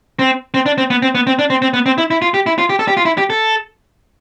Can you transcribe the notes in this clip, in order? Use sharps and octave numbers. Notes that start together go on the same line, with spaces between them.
C4
C4
D4
C4
B3
C4
B3
C4
D4
C4
C4
B3
C4
E4
E4
F4
G4
E4
F4
G4
A4
G4
F4
E4
G4
A4